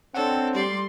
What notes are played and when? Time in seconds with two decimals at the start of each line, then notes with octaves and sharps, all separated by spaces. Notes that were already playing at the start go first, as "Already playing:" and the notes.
0.15 C4 D4 A4 C#5 F#5
0.55 G3 D5 C6